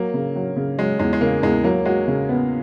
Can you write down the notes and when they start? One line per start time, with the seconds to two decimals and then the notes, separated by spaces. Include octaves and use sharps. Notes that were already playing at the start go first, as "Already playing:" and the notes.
Already playing: F#3 A#3
0.14 C#3
0.36 F#3
0.56 C#3
0.78 F#3 G#3
0.99 E2 G#3
1.13 G#3
1.21 C#3 A#3
1.43 E2 G#3
1.64 F#3 A#3
1.85 G#3 F#4
2.08 C#3
2.29 B3